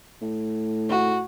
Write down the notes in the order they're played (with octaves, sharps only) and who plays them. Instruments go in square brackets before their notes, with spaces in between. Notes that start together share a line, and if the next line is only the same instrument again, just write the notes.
[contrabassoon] A2
[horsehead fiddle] F#4